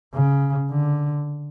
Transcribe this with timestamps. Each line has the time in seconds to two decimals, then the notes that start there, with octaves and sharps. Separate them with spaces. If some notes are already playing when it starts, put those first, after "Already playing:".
0.14 C#3
0.71 D3